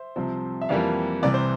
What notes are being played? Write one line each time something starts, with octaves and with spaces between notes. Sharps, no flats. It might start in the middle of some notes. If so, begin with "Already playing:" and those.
Already playing: C5 E5
C2 C3 F3 C4
E5
F2 E3 G3 A#3 D5 F5
C2 C3 E3 D5
C5